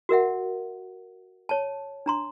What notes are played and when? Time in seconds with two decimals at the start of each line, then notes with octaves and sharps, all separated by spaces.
0.09 F#4 A#4 E5 F#5
1.49 C#5 A5
2.06 D4 A#5 C6